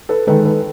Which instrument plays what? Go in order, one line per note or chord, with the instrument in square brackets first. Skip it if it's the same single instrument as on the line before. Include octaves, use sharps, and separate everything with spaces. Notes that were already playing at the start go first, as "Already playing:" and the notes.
[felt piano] A4 B4
D#3 G#3 A4 B4
A4 B4